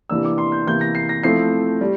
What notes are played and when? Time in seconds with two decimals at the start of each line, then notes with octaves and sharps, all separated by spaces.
0.10 C3 E3 A#3 D4 E6
0.25 D6
0.38 C6
0.52 G6
0.66 C3 E3 A#3 E4 G6
0.81 A#6
0.95 C7
1.09 A#6
1.23 F3 A3 C4 E4 C7
1.81 G3